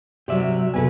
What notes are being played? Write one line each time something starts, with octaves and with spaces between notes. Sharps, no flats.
C3 F#3 G4 D5 E5
C3 B3 F#4 A4 B4 G#5